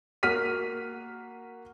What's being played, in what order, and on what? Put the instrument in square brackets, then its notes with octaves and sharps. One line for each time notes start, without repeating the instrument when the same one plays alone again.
[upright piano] A#3 F#4 F6 B6 D#7